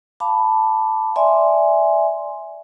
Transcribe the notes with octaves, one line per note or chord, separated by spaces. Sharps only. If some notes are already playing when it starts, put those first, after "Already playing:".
F5 A5 B5 D6
D5 E5 G#5 C6